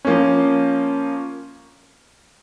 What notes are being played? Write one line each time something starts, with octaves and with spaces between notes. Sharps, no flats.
F3 A#3 C#4